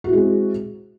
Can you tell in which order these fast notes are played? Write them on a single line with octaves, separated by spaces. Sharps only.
F#4 E4 G#3 C4